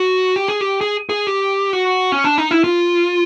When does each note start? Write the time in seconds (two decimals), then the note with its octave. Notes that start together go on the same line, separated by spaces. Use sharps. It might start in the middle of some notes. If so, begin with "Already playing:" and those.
Already playing: F#4
0.36 G4
0.48 G#4
0.61 G4
0.81 G#4
1.10 G#4
1.27 G4
1.73 F#4
2.12 C#4
2.24 D4
2.38 D#4
2.51 E4
2.64 F4